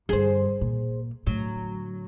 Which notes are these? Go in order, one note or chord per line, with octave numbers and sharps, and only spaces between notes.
G2 D3 G#4 C5
A#2
A2 D3 F#3